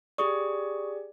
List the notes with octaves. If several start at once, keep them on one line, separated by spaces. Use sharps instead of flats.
G4 G#4 D5 C#6 D#6